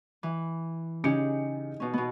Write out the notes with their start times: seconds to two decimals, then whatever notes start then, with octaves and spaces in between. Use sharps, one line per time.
0.23 E3
1.04 C#3 D#4 G4 G#4 C#7
1.80 B2 C#4
1.94 B2 B3